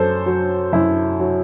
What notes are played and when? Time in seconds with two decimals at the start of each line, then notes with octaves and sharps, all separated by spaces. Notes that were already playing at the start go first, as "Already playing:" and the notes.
Already playing: F#2 A4 C5
0.26 F#3
0.73 F#2 E4
1.20 F#3